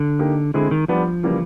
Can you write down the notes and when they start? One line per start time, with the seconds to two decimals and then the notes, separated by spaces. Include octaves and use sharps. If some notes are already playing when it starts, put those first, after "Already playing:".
Already playing: D3
0.19 A#3 D#4 G4
0.54 D3 G#3 C4 E4 G#4
0.71 D#3
0.88 F3 G3 B3 D4
1.23 C#3 E3 G3 A#3